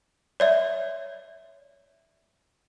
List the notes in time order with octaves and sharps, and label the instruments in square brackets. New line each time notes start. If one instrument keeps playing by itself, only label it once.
[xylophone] C#5 D5 E5